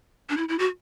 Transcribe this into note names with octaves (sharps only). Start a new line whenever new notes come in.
D4
E4
E4
F#4